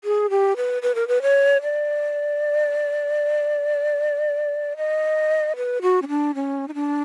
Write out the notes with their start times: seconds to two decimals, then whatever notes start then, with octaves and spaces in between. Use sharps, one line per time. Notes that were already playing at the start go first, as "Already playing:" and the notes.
0.04 G#4
0.30 G4
0.56 B4
0.82 B4
0.95 A#4
1.08 B4
1.22 C#5
1.62 D5
4.77 D#5
5.56 B4
5.82 F#4
6.02 C#4
6.08 D4
6.35 C#4
6.68 D#4
6.75 D4